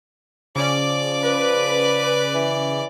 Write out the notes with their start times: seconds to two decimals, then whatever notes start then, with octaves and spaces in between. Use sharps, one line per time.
0.56 C#3 F3 C#4 D5 D6
1.23 B4
2.34 E3